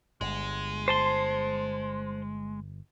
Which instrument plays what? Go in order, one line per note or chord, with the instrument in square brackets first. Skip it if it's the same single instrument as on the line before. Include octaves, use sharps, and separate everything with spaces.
[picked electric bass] G1 [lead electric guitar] G#3
[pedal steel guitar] C5 A5 C6